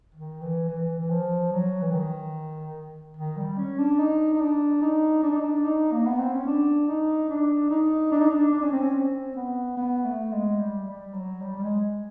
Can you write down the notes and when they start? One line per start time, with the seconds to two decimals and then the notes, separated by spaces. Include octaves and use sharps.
0.15 D#3
0.42 E3
0.69 E3
0.99 E3
1.10 F3
1.52 F#3
1.82 E3
1.92 D#3
3.17 D#3
3.37 G3
3.58 C#4
3.78 D4
3.99 D#4
4.33 D#4
4.41 D4
4.82 D#4
5.23 D4
5.32 D#4
5.41 D4
5.64 D#4
5.92 A#3
6.05 B3
6.19 C4
6.33 C#4
6.47 D4
6.88 D#4
7.29 D4
7.70 D#4
8.12 D4
8.21 D#4
8.30 D4
8.53 D4
8.62 C#4
8.72 C4
8.82 C#4
8.94 C4
9.36 B3
9.77 B3
10.04 A3
10.32 G#3
10.59 G3
10.87 G3
11.14 F#3
11.42 G3
11.57 G3
11.63 G#3